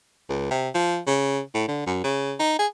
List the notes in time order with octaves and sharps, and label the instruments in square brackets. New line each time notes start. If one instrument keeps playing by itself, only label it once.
[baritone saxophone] C#2
C3
F3
C#3
A2
D3
F#2
C#3
D#4
G#4